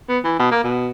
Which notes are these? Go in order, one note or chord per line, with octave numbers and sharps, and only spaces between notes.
B3
E3
B2
A#3
B2